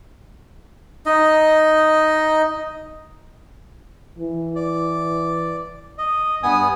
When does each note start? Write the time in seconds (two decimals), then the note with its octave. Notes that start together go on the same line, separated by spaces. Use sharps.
1.06 D#4 D#5
4.19 E3
4.56 D5
5.98 D#5
6.43 G2 B3 G#5 D#6